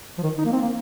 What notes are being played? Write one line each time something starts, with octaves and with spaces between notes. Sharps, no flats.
F3
D#3
D#4
A#3
C4
A#3